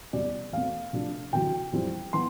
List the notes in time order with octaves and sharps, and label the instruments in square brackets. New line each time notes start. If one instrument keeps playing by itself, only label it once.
[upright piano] E2 C3 E3 G3 B3 D5
E2 B2 A3 C4 F5
C3 F3 A3 D4
D2 C3 E3 G5
F2 E3 G3 C4 E4
E3 B3 C6